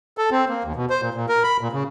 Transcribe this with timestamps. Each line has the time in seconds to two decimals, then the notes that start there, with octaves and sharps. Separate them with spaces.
0.18 A4
0.31 C4
0.49 A#3
0.64 D#2
0.76 B2
0.90 C5
1.02 A#2
1.14 A#2
1.29 A#4
1.44 B5
1.61 A#2
1.73 C#3